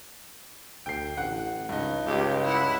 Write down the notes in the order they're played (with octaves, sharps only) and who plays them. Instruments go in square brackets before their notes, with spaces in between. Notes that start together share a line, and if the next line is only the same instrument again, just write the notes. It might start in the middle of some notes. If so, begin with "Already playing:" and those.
[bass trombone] D2 [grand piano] G5 C7
[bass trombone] A1 [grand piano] F#5
[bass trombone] C#2 [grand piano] G2 D#4
[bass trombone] C#2 [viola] G4
[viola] E4 F#5